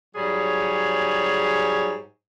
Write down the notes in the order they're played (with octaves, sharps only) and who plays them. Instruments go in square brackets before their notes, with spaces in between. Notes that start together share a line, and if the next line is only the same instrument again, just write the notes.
[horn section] G#2 F#3 G3 G#4 C#5